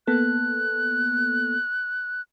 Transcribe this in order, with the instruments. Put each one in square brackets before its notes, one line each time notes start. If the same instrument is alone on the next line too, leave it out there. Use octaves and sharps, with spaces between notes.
[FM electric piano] A#3 B3 A4 [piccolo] F#6